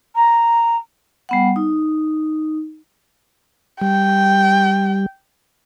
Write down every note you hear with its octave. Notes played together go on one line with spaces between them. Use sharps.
A#5
G3 B3 F#5
D#4
G3 G5